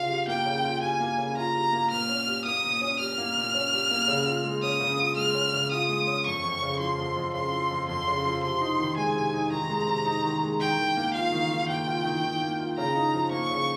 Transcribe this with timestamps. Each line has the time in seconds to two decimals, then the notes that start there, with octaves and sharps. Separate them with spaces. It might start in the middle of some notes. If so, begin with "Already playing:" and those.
Already playing: C#3 F4 F5
0.09 G3
0.28 A#3 G5
0.46 C#3
0.64 F4
0.82 G3 G#5
1.00 A#3
1.18 C#3
1.36 F4 A#5
1.56 G3
1.73 A#3
1.91 A#2 F6
2.09 C#4
2.27 G3
2.45 A#3 D#6
2.63 A#2
2.81 C#4
2.99 G3 F6
3.18 A#3
3.37 A#2
3.55 C#4
3.72 G3
3.91 A#3
4.08 C#3
4.26 F4
4.44 G#3
4.62 C#4 D#6
4.80 C#3
4.99 F4
5.17 G#3 F6
5.35 C#4
5.53 C#3
5.71 F4 D#6
5.89 G#3
6.07 C#4
6.26 F2 C#6
6.44 F2
6.62 C#3
6.79 F3 C6
6.98 F2
7.16 F2
7.34 C#3 C6
7.52 F3
7.71 F2
7.88 F2 C6
8.07 C#3
8.25 F3
8.43 C3 C6
8.61 D#4
8.79 D#3
8.97 G#3 G#5
9.15 C3
9.33 D#4
9.51 D#3 A#5
9.70 G#3
9.88 C3
10.05 D#4
10.24 D#3
10.43 G#3
10.60 D#3 G5
10.78 D#3
10.97 A#3
11.14 F4 F5
11.32 D#3
11.51 D#3
11.69 A#3 G5
11.87 F4
12.05 D#3
12.24 D#3
12.41 A#3
12.60 F4
12.77 C#3 A#5
12.95 D#4
13.14 F3
13.31 A#3 C#6
13.50 C#3